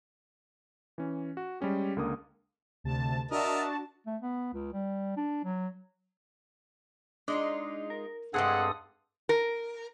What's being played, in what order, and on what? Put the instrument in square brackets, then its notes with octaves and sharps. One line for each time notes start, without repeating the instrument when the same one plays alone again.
[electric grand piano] E3 C#4
F#4
G3 G#3 C#4 G4
C#2 D3 A#3 A#4 D6 D#6
[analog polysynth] D2 C3 A5
[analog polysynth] D4 F#4 A5 [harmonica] A#4 D#5 E5
[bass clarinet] A3
B3
C#2
G3
D4
F#3
[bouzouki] G#3 D#4 F4 [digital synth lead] D4
[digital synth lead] A#4
[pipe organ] G2 A4 D#6 [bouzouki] G#3 A3 C4 [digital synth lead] G#4 [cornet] F#5
[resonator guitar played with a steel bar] A#4